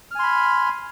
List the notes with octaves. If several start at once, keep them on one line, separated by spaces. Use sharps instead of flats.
G#5 B5 C6 F6